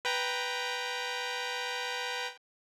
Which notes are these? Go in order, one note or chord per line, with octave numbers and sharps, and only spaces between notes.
B4 G5 A#5